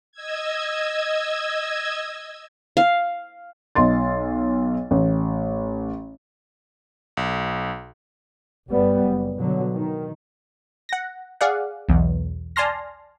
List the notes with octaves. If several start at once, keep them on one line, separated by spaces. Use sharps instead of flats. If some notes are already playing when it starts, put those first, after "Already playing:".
D#5 E6 G#6
F5
B1 D#5 C6 A6
A1
B1
G1 G3 B3
F#1
B2 D3 F#3
D#3
F#5 A#6
G#4 D5 F5 F#5
B1 E2
D5 G#5 A5 C6 F6 A#6